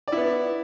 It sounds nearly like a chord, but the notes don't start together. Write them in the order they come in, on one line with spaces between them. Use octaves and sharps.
D5 E4 B3